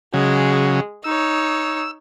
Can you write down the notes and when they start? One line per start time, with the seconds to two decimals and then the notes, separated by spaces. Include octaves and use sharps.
0.14 C#3 F#3 G#3 G#4
1.04 D#4 C#5 E6